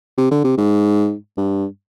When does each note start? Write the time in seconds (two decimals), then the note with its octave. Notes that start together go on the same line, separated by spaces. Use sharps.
0.18 C3
0.31 D3
0.44 C3
0.58 G#2
1.37 G2